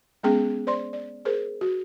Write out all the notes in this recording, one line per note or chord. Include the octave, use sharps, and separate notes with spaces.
G#3 B3 C#4 G#4 G5
C5 D5 C6
D5
G#4 A#4 C5
F#4